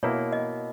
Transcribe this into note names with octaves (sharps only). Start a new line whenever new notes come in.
B2 A#3 E4 C#5
D#5